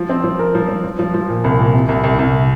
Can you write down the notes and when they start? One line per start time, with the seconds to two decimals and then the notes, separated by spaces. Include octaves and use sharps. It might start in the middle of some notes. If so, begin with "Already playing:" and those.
Already playing: F3
0.09 C4
0.24 F3
0.39 A#4
0.55 F3
0.69 F3
0.84 F3
0.99 F3
1.14 F3
1.29 A#2
1.44 C2
1.59 A#2
1.74 C3
1.89 C2
2.04 C2
2.19 C2